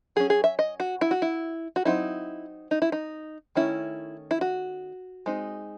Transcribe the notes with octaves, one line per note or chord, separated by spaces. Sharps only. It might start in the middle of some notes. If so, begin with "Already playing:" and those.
F#3 C#4 G#4
G#4
E5
D#5
F#4
E4
F#4
E4
F#4
F#3 C4 D#4 E4
D#4
E4
D#4
D#3 A3 C#4 E4
E4
F#4
G#3 C4 D#4